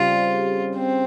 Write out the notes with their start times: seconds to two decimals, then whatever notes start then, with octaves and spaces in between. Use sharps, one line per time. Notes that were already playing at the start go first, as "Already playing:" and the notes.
Already playing: C#3 G3 C4 F4
0.77 C4